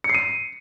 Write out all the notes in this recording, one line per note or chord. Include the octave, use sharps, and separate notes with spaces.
C#7
C7
D#7